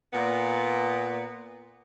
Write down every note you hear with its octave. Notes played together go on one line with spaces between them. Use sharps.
A#2 B3